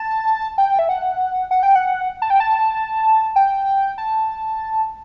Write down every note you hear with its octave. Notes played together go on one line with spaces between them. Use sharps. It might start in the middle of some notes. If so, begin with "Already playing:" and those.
Already playing: A5
G5
E5
F#5
F#5
G5
F#5
A5
G5
A5
G5
A5